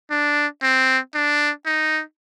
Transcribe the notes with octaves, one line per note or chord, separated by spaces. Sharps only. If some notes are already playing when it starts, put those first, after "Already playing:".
D4
C4
D4
D#4